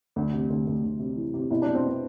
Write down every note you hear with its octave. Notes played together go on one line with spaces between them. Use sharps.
D2
C3
D2
D2
D2
C3
E3
C3
B2 E4
B2 D4
C4
B3 D4